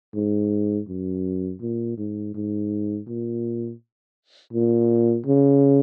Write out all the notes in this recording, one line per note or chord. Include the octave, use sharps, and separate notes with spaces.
G#2
F#2
A#2
G#2
G#2
A#2
A#2
C#3